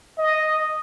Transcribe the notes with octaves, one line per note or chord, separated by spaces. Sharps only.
D#5